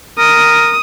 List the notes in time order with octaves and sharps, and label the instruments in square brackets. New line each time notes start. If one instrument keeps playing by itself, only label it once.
[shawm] A#4 [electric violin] D#6